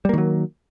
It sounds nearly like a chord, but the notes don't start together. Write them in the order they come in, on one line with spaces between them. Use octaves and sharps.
G3 A#3 D#3 F#3